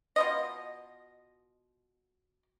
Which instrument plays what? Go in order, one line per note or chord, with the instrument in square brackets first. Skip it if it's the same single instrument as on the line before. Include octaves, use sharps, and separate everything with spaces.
[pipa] B2 F4 D#5